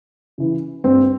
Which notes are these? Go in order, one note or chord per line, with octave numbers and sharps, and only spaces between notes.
C#3 E3
G2 C4